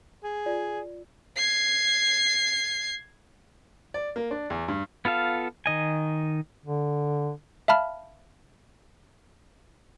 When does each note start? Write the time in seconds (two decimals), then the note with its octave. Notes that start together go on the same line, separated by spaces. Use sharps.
0.24 G#4
0.46 F4 D5
1.37 G#6 C7
3.94 D5
4.16 A#3
4.31 D4
4.50 E2
4.68 G2
5.05 B3 F4 A4 F5
5.66 D#3 D#5 G#5
6.65 D3
7.68 E5 F5 A5 B5 F6